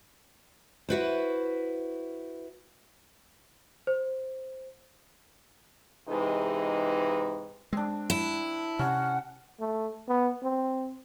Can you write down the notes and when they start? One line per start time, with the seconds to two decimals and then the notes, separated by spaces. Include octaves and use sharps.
0.89 E4 F#4 B4 C5
3.87 C5
6.08 G#2 C3 E3 D#4 G#4 B4
7.73 G#3 C4 D4
8.10 E4
8.79 C3 C#4 F#5
9.59 A3
10.08 B3
10.43 C4